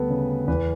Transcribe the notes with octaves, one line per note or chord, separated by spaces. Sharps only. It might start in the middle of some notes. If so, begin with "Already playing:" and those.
Already playing: D2 G3 B3 A4 B4
C#3
E2 B4